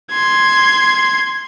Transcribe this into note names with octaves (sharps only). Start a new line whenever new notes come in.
C6 G#6